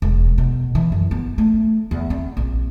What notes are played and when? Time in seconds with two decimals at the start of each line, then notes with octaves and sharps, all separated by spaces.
0.02 E1
0.38 B2
0.75 E3
0.92 F#2
1.11 B3
1.38 A3
1.91 E2
2.10 C4
2.37 A#1